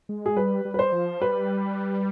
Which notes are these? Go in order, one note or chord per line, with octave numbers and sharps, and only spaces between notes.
G#3
G#4
G3 B4
G3
B4
C5
F3
G3 B4